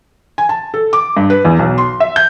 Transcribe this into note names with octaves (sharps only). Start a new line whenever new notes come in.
G#5
A5
A4
D6
G2
B4
E2
B1
C6
E5
G6